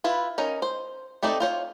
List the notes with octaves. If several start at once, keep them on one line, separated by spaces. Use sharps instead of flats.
E4 F4 B4
C#4 D#4 A#4
C5
A3 C4 D#4 A4 D5
F4 C5 C#5